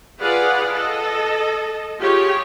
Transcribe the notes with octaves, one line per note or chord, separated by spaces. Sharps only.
F4 G#4 B4 D5 F5 F#5
A4 D#5
F4 G4 G#4 C#5